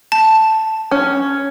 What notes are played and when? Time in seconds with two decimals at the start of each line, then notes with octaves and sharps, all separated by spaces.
0.12 A5
0.91 C#4